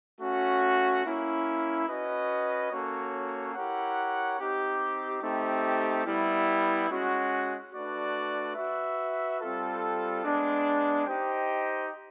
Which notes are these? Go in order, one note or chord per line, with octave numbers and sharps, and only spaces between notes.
A3 C#4 F#4
A#3 C#4 E4
C#4 F#4 B4 D#5
A#3 C#4 F#4 A4 C#5
E4 G4 A#4 C#5 F#5
C4 D#4 G4
A3 C4 D#4 G4
G3 B3 E4
G#3 C#4 F#4
A3 D4 F#4 B4 D5
F#4 B4 E5
G3 C4 F4 A4
G#3 B3 D4
D#4 G4 C5 D#5 G5